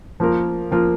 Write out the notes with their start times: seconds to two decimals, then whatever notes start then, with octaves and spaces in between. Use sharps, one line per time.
0.20 F3 A#3 F4 A#4
0.71 F3 A#3 F4 A#4